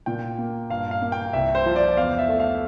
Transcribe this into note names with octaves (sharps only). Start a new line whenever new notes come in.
A#2 G5
A#3
G2 F5
F5
A#3
G5
C2 E5
C5
F3
D5
E2 F5
E5
A3
F5